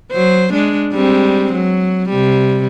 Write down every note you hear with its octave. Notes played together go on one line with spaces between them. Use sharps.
F#3 C5
G#3 D4
G3 G#3 C4
F#3
C3 G3